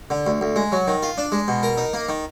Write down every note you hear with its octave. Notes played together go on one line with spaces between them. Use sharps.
D3
D2
D2
G#3
F#3
D#3
F4
D4
G#3
B2
A#4
D#4
A#3
D#3